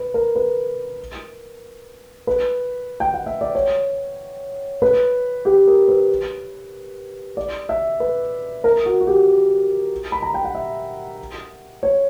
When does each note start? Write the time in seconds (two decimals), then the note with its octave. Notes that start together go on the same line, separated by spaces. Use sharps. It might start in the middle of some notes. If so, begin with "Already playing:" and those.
Already playing: B4
0.14 A#4
0.36 B4
2.27 B4
3.00 G5
3.14 F#5
3.26 E5
3.41 D5
3.55 C#5
4.82 B4
5.45 G4
5.67 A#4
5.88 B4
7.37 D5
7.69 E5
8.00 B4
8.64 A#4
8.85 F#4
9.01 F#4
9.07 G4
10.12 B5
10.22 A#5
10.34 G5
10.45 F#5
10.55 E5
11.83 C#5